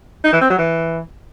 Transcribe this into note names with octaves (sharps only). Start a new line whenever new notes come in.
D#4
E3
C4
F#3
E3